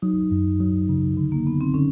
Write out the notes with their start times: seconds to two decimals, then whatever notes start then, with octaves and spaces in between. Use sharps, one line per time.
0.02 F#3 D#4
0.31 F#2
0.60 F#3
0.89 C#3
1.17 D3
1.32 A#3
1.46 D3 B3
1.61 C4
1.74 D3 C#4